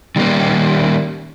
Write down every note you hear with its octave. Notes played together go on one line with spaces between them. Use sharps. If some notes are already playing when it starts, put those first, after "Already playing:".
D#3 G3 A3 A#3 C#4